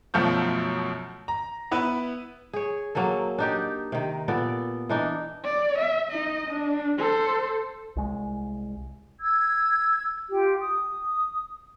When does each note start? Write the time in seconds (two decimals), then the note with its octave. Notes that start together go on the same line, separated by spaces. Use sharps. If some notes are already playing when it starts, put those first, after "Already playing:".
0.14 F#2 B2 F3 A3 F4 G6
1.28 A#5
1.71 B3 E4 B4
2.53 G#4 C#5
2.95 F#3 A#3 G#4 A4
3.38 D4 D#4 G4
3.92 C3 D#3
4.28 A#2 B3 A4 D5
4.89 E3 D4 D#4
5.44 D5
5.79 E5
6.11 D#4 D#5
6.50 D4
6.99 A4 C5
7.96 C2 G#3
9.20 E6 G#6
10.30 F4 G4
10.61 D#6